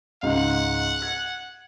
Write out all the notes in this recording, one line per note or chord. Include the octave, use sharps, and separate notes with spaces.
C#2 G#2 F#5
G#6